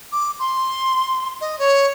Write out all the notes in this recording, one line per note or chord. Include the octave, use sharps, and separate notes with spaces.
D6
C6
D#5
C#5